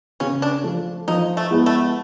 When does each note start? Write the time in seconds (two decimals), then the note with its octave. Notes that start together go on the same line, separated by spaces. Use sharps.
0.20 C#3 C#4
0.42 D4
0.64 F3 A3
1.08 F3 D#4
1.37 A3
1.51 G#3 B3 E4
1.66 A3